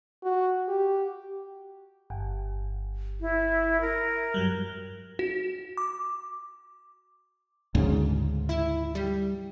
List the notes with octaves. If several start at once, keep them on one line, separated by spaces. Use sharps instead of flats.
F#4
G4
G1
E4
A#4
G2 F#3 G3
F#4
D6
D2 G#2 C#3
E4
G3